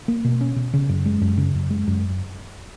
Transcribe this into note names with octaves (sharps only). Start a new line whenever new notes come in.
A#3
B2
C#4
B2
C#3
F#2
G#3
F#2
C#3
F#2
G#3
F#2